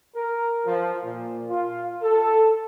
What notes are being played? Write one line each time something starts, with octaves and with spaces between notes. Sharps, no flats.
A#4
F3
A#2
F4
A4